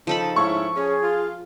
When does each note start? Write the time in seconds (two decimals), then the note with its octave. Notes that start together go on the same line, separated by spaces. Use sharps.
0.07 C#3 F3 D#4 A4 B5
0.36 G#2 C#4 E4 C#6
0.76 C#4 G#4
1.03 F4